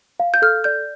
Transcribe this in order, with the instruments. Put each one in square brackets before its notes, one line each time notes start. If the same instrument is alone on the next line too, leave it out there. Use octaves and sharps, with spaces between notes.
[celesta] F5
[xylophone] G6
[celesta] A4 [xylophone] F6
[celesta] D5 [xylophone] G6